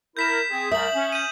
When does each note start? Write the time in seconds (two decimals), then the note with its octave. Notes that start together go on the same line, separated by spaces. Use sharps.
0.17 E4 A#4 G6 B6 E7
0.50 C4 G#4
0.72 C2 A3 A#4 E5 D#6 F#7
0.94 C#4
1.12 G6 D#7